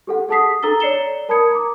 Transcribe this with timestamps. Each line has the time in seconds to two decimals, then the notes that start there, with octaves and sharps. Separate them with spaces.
0.07 G4 A4 F#5
0.29 G#4 A4 A5 D#6 B6 C7
0.63 A4 A#5 E6 A6 G7
0.80 C#5 D5 C7 C#7 E7 G7
1.29 A#4 A5 B5 D#6 G#6 C#7
1.51 A#5 D6